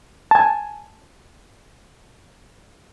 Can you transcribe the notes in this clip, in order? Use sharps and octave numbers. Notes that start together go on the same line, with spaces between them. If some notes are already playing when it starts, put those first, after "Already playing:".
G#5 A5